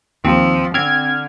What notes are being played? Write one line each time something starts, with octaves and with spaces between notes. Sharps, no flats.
D#2 F3 C4
D3 C4 F6 G#6